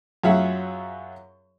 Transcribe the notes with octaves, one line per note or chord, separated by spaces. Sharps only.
F#2 F#3 F4 G#4 E5 F#5